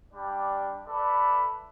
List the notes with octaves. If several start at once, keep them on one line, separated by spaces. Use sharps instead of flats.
G3 D4 D5 G5
A4 B4 D5 E5 B5